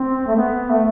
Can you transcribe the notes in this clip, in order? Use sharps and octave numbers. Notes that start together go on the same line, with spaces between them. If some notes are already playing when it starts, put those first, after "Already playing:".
Already playing: C4
A3
B3
A3